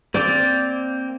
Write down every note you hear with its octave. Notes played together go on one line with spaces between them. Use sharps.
A#3 C4 D5